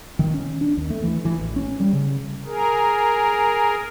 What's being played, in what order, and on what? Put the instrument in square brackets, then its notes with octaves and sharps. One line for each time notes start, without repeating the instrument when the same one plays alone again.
[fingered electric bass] D#3
C#4
D4
D#2
A3
E3
E3
A1
C#4
G3
C#3
[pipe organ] G#4 A#4